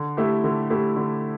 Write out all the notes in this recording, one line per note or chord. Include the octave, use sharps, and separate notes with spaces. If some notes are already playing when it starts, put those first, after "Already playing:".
Already playing: D3
A3 E4 G4
D3
A3 E4 G4
D3